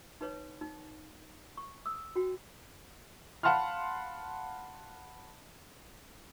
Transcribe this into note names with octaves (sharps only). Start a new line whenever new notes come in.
D#4 B4 C#5
D#4
C#6
D#6 E6
F#4 G5
F5 F#5 A5 B5 C6 F6